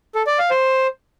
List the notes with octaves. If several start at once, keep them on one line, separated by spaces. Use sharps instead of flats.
A4
D5
F5
C5